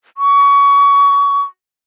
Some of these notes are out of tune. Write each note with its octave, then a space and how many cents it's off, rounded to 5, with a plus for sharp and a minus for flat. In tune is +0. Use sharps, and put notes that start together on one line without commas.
C#6 +25